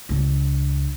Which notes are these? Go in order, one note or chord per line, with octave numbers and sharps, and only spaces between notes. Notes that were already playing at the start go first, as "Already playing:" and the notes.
C#2 D4